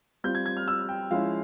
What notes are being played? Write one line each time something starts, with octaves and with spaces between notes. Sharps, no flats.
G3 C4 F4 G6
G#6
G#6
F6
E6
G5
F3 G#3 C#4 E4 F5